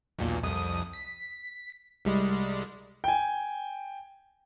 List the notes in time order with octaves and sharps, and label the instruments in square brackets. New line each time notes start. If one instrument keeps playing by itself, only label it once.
[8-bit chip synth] B1 E2 A#2
C2 F2 D#6
B6
C2 G3 G#3
[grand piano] G5 G#5